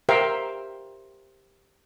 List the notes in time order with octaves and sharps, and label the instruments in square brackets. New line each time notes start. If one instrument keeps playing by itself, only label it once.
[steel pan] G4 A#4 C5 E5 F5 G5